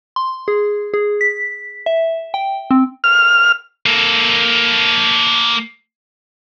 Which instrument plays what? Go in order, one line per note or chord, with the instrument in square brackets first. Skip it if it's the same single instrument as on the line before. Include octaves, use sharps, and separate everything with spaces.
[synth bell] C6
G#4
G#4
B6
E5
G5
C4
[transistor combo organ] F6
[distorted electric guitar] A#3 A4